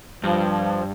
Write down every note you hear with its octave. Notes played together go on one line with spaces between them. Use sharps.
G2 F3